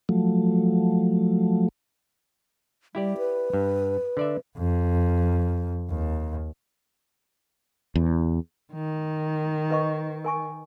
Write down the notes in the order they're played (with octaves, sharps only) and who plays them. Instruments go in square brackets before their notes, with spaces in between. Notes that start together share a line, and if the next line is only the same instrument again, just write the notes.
[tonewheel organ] F3 F#3 A3
[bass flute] G3 [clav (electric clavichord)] E4 G4 D5
[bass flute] B4
[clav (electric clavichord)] G2
D3 D5 E5
[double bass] F2
D#2
[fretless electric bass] E2
[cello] D#3
[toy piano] B4 D#5 C#6
A#4 G#5 C#6